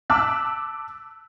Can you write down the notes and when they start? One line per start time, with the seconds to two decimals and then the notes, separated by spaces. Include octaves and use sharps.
0.10 A5 D6 E6 F#6 B6